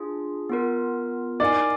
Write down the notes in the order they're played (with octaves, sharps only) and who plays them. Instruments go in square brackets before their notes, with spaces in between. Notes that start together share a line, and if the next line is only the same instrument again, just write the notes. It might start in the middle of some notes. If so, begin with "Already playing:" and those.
Already playing: [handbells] D4 F4 G#4
B3 F4 A#4
[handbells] D#4 A#4 F5 G#5 [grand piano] D5